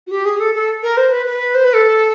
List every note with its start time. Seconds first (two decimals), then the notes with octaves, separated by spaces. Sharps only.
0.07 F#4
0.11 G4
0.25 G#4
0.40 A4
0.54 A4
0.83 A#4
0.97 C5
1.12 B4
1.26 B4
1.55 C5
1.64 B4
1.74 A4